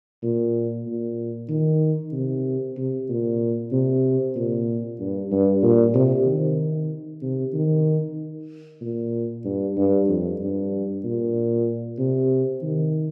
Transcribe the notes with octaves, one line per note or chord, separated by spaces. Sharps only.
A#2
A#2
D#3
C3
C3
A#2
C3
A#2
G2
G2
A#2
C3
D#3
C3
D#3
A#2
G2
G2
F2
G2
A#2
C3
D#3